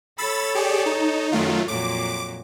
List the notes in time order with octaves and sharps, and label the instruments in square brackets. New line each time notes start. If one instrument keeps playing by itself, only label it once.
[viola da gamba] A4 C#5 [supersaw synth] B5 E6 A6
[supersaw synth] G4 G#4 D5
D#4
[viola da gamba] F#2 D#3 [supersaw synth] F#3 A3 F4
[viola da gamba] F2 A#2 F#3 [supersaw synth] D6